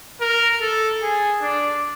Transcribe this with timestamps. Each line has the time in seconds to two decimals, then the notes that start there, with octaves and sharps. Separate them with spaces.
0.21 A#4
0.61 A4
1.02 G#4
1.42 D4